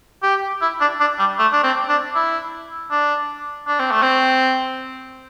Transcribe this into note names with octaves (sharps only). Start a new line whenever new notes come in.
G4
E4
D4
D4
G3
A3
D4
C4
D4
E4
D4
D4
C4
A3
C4